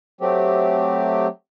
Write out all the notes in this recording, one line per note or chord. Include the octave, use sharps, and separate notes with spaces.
F#3 A3 C4 G4